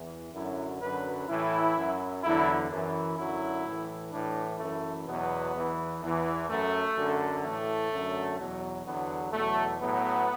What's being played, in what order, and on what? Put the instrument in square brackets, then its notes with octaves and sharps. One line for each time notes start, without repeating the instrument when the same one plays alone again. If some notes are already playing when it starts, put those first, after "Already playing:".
Already playing: [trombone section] E2 E3
F#2 D3 F#3 E4
F#2 D3 F#3 B4
A2 E3 E4
F#2 F#3
E2 D3 F#3 E4
F#2 E3
F#2 D3 F#3 E4
A2 E3
A2 E3 D4
F#2 E3 A3
E2 B2 F#3 B3
E2 E3
E2 E3
F#2 F#3 A3
F#2 D3 F#3
A2 E3 A3
F#2 D3 F#3
E2 B2 F#3
E2 D3 F#3 B3
E2 B2 F#3 A3
A2 F#3 B3